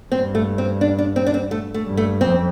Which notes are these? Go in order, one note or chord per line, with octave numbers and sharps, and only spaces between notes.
G2 C4
A3
C4
D4
D4
C4
D4
C4
A3
A3
G2
A3
F2 C4